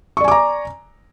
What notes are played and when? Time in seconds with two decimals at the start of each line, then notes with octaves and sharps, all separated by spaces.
0.17 C#6
0.21 D5
0.24 G#5
0.28 D6
0.32 A#5